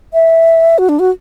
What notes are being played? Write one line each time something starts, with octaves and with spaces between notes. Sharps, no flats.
E5
F#4
D4
F#4